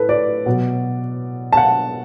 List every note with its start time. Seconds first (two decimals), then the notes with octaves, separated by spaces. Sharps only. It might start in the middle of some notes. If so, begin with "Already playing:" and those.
Already playing: A2 A4 B4
0.09 D5
0.46 B2 F#3
1.53 A5
1.57 F#5